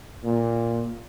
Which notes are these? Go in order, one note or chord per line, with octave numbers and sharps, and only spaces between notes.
A#2